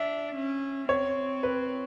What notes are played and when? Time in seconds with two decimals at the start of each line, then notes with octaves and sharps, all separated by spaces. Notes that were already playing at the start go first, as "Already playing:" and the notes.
Already playing: D4 E5
0.36 C#4
0.89 C4 C#5
1.43 B4